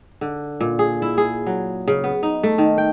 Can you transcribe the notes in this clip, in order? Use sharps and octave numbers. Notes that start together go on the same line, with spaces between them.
D3
A#2
G#4
E4
G#4
F#3
C#3
B3
D#4
A3
D#3
G5